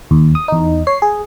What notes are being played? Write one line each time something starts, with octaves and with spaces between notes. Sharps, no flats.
D#2
D#6
E2 D#4
C#5 C7
G#4